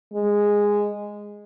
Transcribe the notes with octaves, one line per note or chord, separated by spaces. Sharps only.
G#3